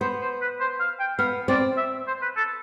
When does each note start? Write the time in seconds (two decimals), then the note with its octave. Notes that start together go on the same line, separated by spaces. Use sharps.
0.01 B3 C5
0.22 C5
0.41 B4
0.60 C5
0.80 F5
1.00 G5
1.18 B3 F5
1.48 C4 D5
1.77 E5
2.07 C5
2.22 B4
2.36 A4